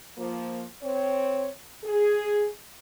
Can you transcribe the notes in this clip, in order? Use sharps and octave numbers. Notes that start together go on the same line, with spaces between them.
F3 A#3
C4 C#5
G#4